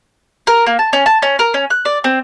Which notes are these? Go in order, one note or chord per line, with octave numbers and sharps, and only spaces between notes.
A#4
A#3
A5
C#4
A5
C#4
A#4
C#4
F#6
D5
C4